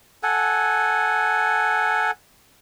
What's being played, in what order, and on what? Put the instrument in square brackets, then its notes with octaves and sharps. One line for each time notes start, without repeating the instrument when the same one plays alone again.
[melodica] A4 F#5 G#5